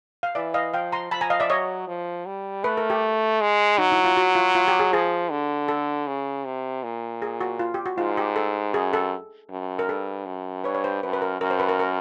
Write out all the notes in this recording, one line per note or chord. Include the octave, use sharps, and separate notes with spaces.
F5
E3 D5 E5
D#5 F5
F3 F5 G5
A#5 C6
F3 A5 B5
G#5 A#5
D#5 F5
D5 E5
F#3 C#5 D#5
F3
G3
A3 B4
A#4
G4
G#3
F#3 D#4
E4
F4
F#4
F4
F4
G4
G#4
F3 G#4
D3
A4
C#3
C3
A#2
G#4
F#4
F4
G4
F#4
G#2 F4
G4
A4
F#2 G#4
A4
F#2
A#4
G2 A4
F#2
G2 B4 C#5
C#5
C5
F#2 B4
B4
A#4
F#2 A#4
C5
B4
A#4
A#4